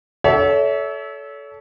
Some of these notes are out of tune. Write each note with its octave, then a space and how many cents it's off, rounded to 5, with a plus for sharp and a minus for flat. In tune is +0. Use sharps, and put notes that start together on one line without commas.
A4 -15 C#5 +35 E5 -20